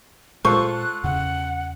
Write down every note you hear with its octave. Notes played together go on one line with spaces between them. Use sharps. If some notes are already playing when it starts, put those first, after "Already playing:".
A#2 G#3 F4 A4 C5 C#6 F#6
E2 C#3 F#5